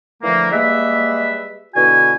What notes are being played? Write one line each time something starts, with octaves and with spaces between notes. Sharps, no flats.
D3 E3 F3 A3 A#3
G3 G#3 A#3 B4 E5
B2 D3 E4 F#4 G#5